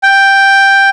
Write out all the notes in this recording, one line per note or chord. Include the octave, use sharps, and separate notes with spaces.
G5